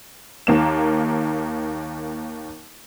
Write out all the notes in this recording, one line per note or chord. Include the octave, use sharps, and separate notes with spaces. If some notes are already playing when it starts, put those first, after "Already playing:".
D#2 A#3 E7